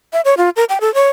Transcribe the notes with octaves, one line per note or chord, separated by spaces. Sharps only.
E5
C#5
F4
A#4
G5
A4
C#5